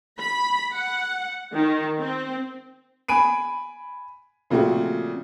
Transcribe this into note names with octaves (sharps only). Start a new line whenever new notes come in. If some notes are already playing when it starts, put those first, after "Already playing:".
B5
F#5
D#3
C4
G#5 B5 D7 D#7
A#2 C#3 F3 A3 C4 F#4